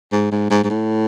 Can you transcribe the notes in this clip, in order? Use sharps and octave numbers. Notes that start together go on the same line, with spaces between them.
G#2
G#2
G#2
G#2
A2